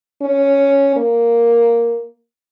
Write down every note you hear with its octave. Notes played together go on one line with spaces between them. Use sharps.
C#4
A#3